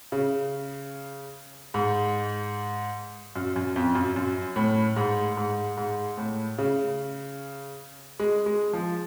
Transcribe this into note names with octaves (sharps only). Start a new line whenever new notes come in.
C#3
G#2
F#2
F#2
F2
F#2
F#2
A2
G#2
G#2
G#2
A2
C#3
G#3
G#3
F3